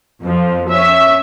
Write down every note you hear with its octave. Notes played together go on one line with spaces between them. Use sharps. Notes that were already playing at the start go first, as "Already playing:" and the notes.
F2 F3
C#4 E5